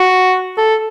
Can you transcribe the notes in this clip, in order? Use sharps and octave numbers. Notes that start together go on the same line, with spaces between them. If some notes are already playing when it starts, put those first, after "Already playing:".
Already playing: F#4
A4